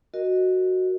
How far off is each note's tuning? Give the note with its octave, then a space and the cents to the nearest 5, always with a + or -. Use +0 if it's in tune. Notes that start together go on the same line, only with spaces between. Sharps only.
F#4 +0 A#4 +0 D#5 +0